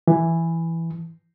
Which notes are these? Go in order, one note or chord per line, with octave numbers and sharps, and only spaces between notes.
E3